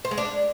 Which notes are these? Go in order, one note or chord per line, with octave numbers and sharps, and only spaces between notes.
C5
G#3
D4